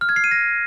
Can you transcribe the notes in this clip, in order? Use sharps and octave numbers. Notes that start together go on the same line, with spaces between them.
F6
G#6
C7
D#7
A#6